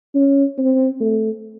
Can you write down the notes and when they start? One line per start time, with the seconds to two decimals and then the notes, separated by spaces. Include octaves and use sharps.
0.15 C#4
0.58 C4
1.01 A3